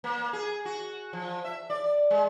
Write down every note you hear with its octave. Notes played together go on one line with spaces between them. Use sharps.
A#3
G#4
F#4
F3
E5
D5
G#3